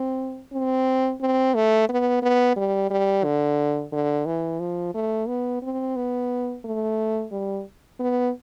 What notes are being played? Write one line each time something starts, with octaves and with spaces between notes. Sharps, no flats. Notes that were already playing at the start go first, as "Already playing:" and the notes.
Already playing: C4
C4
C4
A3
B3
B3
G3
G3
D3
D3
E3
F3
A3
B3
C4
B3
A3
G3
B3